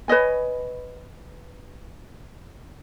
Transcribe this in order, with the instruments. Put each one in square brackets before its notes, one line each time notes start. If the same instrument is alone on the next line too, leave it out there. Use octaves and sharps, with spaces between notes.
[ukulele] B4 C#5 D#5 G#5